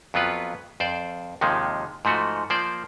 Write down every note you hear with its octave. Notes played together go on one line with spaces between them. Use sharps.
F2 F#3 B3 F4 B4
F2 C5 D5
D#2 C3 D#3 F3 G#3
G#2 F3 A3 F#4
F3 A#3 C5 D5